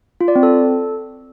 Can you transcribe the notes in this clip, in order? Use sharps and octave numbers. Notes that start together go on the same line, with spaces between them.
F4
D5
C4
A4